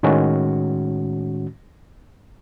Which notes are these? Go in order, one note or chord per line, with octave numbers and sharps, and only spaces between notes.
A2 D#3 G#3 C#4 F#4